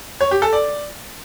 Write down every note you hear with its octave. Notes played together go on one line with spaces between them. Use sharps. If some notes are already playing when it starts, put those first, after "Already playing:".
C#5
G4
A4
D5